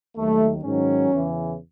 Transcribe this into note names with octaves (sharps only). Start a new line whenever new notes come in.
D#2 D#3 F#3 A3
G#2 D#3 F#3 C#4
E2 C#3 E3